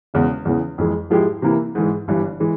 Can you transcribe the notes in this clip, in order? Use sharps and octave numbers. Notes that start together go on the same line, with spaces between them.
E1 E2 C#3
E2 C#3 E3
F2 E3 G#3
G#2 F3 G#3 E4 G4
C3 E3 A#3 E4
G#2 E3 G#3
G1 G2 E3 G3
E3 G#3